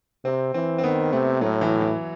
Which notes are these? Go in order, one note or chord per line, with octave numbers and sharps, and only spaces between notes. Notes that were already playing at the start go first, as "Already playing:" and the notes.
C3 C4
E3 C4
C4
D#3 B3
C3 A3
A2 F#3
E3
E3